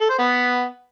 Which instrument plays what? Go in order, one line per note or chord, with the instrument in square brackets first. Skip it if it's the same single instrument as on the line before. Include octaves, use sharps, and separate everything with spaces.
[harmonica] A4
C5
B3